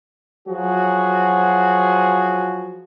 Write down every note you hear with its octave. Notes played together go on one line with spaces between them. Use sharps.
F3 F#3 F#4 G#4